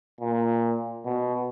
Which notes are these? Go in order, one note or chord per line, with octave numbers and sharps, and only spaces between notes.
A#2
B2